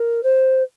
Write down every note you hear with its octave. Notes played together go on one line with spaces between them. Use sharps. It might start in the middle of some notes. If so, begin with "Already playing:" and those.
Already playing: A#4
C5